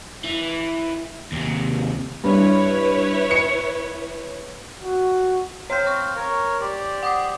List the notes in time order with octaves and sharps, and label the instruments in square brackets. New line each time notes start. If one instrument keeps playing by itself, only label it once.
[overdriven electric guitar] E3
D#2 C3
[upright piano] G2 [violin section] E4 B4 C#5
[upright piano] C#7
[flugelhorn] F#4
[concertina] C4 C5 F5 [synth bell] C#5 G6
[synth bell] C#6
[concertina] A#4 C#5
G4 C5 D5
[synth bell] F#5 D6 D#6